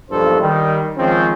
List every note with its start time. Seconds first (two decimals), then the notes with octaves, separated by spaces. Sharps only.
0.11 B1 G2 F3 A#3 A4 C5
0.41 D#3 G3
0.97 D#3 F3 G#3 C4 C#4